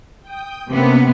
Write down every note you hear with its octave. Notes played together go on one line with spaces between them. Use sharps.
G5 D#6
C3 A#3 B3 C#4